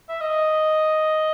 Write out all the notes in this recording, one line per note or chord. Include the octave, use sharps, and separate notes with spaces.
E5
D#5